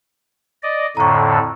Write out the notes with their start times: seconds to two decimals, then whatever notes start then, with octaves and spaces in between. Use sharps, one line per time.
0.63 D5 D#5
0.97 F2 A2 D3 A#5 C#6